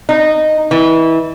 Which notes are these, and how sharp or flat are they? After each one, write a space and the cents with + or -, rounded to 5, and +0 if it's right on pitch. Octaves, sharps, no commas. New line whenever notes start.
D#4 -10
E3 -25